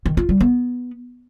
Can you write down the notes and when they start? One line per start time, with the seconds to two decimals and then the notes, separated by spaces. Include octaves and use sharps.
0.06 D#3
0.17 F4
0.29 G3
0.41 B3